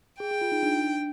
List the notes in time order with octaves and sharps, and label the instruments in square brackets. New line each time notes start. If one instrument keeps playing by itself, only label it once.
[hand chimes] G#4 [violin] G5
[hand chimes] G#4
F4
D#4
D4